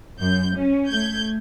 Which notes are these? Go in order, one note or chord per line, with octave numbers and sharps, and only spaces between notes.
F#2 G6
C#4
A3 G6 G#6